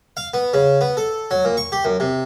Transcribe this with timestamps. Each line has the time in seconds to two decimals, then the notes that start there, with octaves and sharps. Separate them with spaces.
0.17 F5
0.34 B3
0.54 C#3
0.81 B3
0.97 A4
1.31 F#3
1.45 A#2
1.57 C#6
1.72 G4
1.85 F#2
2.00 C3